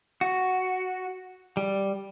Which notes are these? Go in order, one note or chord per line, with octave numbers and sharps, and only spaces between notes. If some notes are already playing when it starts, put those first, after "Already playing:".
F#4
G3